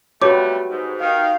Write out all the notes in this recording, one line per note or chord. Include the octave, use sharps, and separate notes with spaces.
F2 G3 A3 F#4 G4 B4 C#5 D6
G#2
D#3 F5